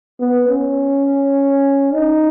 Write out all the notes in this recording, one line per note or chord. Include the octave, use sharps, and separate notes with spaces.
B3
C#4
D#4